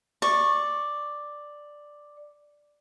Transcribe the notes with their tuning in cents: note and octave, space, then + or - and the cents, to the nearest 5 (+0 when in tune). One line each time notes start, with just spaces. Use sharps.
D5 +5 C#6 -15